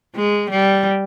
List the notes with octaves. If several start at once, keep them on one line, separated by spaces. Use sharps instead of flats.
G#3
G3